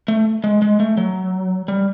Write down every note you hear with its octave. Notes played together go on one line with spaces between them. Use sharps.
A3
G#3
G#3
A3
F#3
G3